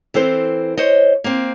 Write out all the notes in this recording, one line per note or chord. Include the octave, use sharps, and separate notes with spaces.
E3 C4 A4 C5
C5 C#5 D#5
A#3 C4